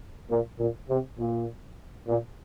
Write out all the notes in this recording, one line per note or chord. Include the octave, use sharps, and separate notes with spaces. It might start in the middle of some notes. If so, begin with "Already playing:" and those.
A#2
A#2
C3
A#2
A#2